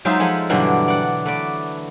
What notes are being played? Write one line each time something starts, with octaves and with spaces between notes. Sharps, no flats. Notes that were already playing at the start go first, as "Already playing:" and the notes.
F#3 G#3 D#4 F4 C5 E5
F3 G#3 A4 G#5 B5
G2 B2 D3 E3 F#3 G3
D5 F#5
A3 B4 D5